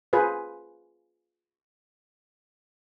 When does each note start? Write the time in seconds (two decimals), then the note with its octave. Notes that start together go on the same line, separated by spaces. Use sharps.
0.13 F4 G#4 B4 C5